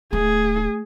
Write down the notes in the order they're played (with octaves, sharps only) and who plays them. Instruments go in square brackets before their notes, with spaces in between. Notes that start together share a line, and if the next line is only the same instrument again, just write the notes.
[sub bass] D1 [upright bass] A3 [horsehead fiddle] G#4